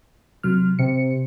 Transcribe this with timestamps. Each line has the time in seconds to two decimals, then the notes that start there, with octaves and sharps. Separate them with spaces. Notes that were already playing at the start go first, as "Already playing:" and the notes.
0.43 C3 F#3 F6
0.79 C3 C#7